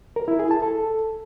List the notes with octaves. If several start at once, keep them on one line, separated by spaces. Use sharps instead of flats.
A#4
E4
G#4
A5
A4